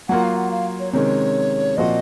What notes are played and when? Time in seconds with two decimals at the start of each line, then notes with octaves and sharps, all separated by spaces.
0.08 F#3 A#3 F4 F#5
0.23 F5
0.37 F#5
0.51 F5
0.80 C#5
0.93 C3 D#3 G#3 C#4 C#5
1.77 A#2 F3 C4 F#4 D#5